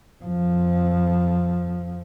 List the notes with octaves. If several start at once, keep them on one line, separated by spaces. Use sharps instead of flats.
F2 F3